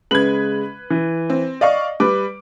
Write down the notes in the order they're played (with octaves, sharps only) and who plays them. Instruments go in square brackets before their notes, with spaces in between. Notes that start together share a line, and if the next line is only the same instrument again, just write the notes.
[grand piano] C#3 G#3 F#7 [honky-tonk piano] B4 G#6
[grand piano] E3
[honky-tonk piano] C4
[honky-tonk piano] D5 F5 C#6 [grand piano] D#5
[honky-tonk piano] G3 B4 [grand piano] D6